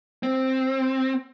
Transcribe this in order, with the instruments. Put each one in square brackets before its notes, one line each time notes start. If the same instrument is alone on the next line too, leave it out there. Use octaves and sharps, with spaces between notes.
[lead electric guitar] C4